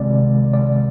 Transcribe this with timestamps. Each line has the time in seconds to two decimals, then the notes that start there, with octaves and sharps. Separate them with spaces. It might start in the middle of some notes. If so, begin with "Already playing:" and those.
Already playing: C2 C3 D#3 G#3 C4 D5
0.54 D5